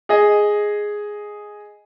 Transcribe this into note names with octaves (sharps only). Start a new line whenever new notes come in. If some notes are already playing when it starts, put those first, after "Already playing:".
G#4 D#5